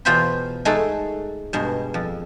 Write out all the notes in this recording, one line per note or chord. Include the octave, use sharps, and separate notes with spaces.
E2 B2 F4 C5 G5 B5
G#3 A3 D#4 F#4 A4
G2 B2 G#3
F2